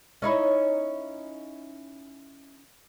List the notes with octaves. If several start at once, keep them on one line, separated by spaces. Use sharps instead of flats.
C#4 D#4 E4